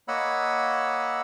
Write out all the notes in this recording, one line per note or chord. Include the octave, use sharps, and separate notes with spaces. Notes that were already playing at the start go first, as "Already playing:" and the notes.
A#3 C#5 D#5 F#5 B5 E6